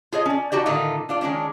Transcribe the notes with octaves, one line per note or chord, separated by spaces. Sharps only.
F4 G#4 C#5 D#5
C#4 D5
D#4 F#4 G4 D5
A2 D3 D#3 D#4 F4
D4 F4 D5
D#3 G#3 C#4 D4